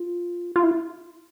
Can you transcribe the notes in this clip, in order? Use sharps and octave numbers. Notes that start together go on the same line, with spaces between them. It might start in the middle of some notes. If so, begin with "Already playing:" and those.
Already playing: F4
F4
E4